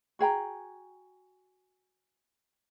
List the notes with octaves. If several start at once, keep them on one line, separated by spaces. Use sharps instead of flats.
F#4 G#4 G5 A#5